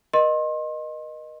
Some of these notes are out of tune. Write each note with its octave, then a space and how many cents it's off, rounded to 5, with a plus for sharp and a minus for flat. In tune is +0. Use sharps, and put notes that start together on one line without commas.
A#4 +40 D#5 -15 C6 +35